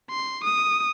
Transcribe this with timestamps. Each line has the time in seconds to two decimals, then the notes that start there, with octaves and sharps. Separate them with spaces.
0.10 C6
0.44 D#6